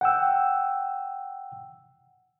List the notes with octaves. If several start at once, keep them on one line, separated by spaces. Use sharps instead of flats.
F#5 G5 E6